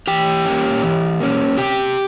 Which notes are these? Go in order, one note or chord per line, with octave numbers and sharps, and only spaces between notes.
E3 G4 G5
A#3 C#4
E3
A#3 C#4
C3 G4 G5